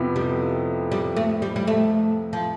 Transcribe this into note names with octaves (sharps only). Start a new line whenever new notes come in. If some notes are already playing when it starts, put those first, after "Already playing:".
Already playing: F2 C3 F3 B3 E4
G3
G3
A3
G3
G3
A3
F3